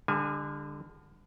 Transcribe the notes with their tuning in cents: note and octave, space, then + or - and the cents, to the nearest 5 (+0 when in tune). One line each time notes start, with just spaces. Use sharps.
D3 +5 G3 +45 G#5 +0